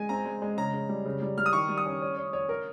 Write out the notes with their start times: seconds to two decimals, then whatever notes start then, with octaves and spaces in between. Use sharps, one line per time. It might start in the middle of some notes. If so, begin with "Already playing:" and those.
Already playing: G#3 G#5
0.09 C4 A#5
0.25 G#3
0.42 G#3
0.57 C#3 A#5
0.74 C#3
0.89 G3
1.05 C#3
1.22 G3
1.38 G3 F6
1.46 D#6
1.53 D#3 C#6
1.69 G3
1.78 D#6
1.86 C#4
2.02 C#5
2.17 C#5
2.33 C#5
2.49 A#4